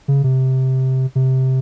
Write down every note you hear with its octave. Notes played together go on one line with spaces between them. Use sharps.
C#3
C3
C3